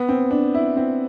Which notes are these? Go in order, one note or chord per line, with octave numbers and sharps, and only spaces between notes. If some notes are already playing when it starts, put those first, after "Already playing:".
Already playing: B3
C4
D4
E4
C4